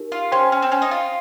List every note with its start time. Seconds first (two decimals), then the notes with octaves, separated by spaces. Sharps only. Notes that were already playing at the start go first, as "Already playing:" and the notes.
Already playing: D#4 G4 A#4
0.12 F4
0.32 C#4 C5 G5 C6
0.52 C#4
0.62 C4
0.72 C#4
0.82 D#4
0.91 F4